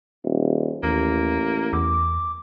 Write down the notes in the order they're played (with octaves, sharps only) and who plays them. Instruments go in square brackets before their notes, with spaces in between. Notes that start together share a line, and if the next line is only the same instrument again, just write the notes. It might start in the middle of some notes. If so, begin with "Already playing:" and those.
[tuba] D#1
[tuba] A1 [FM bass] D#2 [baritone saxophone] A#3
[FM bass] E2 [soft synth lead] D6